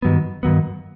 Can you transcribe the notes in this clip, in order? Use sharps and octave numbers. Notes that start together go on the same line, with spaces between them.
G2 D#3 F#3 B3
G2 D#3 F#3 B3